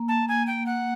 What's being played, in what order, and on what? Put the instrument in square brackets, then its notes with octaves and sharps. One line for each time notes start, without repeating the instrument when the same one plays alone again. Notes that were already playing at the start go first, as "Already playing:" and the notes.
Already playing: [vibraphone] A#3
[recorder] A5
G#5
G5
F#5